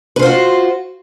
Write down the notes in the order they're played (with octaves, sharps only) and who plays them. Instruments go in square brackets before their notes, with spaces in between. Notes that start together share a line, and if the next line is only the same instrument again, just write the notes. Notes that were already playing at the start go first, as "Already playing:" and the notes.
[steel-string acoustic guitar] B4
C5
F4
F#4